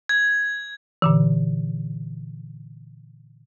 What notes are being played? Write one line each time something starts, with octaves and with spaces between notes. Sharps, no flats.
G#6
A#2 D3 E3